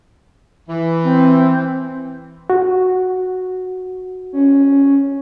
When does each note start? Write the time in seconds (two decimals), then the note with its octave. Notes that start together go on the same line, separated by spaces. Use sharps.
0.69 E3
1.03 C4
2.50 F#4
4.33 C#4